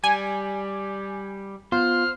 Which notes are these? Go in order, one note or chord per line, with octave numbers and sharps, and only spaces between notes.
G3 G#5
B3 F4 C5 F6